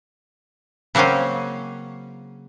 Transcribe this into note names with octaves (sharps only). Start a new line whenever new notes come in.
C#3 F#3 A#3 C4 C#4